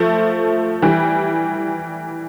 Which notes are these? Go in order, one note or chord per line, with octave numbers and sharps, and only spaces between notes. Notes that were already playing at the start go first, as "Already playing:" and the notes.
Already playing: F3 A3
E3 G3